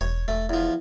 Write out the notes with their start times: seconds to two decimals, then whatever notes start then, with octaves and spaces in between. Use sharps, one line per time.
0.01 E1 C#5
0.28 E1 A3
0.49 E2 F3